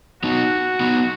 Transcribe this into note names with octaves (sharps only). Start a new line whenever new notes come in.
B3 D#4 F#4
B3 D#4